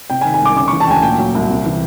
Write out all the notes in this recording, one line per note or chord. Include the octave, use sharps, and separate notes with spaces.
C3 G5
G#5
D#3
G#5
C2 D6
C#3 D6
E3 C#6
A5
D2 G5 G#5
A#2 G5
F#3
C2
C3
E3